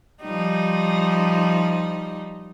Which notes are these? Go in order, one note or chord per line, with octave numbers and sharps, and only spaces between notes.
F3 G3 D#4